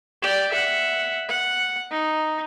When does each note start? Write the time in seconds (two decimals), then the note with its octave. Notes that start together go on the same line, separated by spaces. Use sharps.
0.22 G4 D5
0.51 E5 F#5
1.29 F#5
1.91 D#4